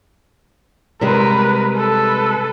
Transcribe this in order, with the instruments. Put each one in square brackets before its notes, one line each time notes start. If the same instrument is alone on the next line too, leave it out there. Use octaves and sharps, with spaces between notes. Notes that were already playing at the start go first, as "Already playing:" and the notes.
[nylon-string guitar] C3 G3 G#3 [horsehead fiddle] A#4 B4
[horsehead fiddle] A4 B4